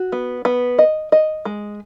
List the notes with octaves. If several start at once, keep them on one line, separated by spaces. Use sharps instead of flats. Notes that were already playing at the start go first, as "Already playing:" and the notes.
Already playing: F#4
B3
B3
D#5
D#5
G#3